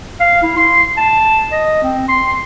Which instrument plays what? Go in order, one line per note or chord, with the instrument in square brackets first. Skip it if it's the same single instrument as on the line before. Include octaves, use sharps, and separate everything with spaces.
[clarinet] F5
E4
C6
A5
D#5
C4
C6